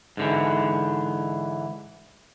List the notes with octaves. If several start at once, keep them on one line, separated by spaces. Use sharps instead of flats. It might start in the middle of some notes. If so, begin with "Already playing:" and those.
G#2 D3 E3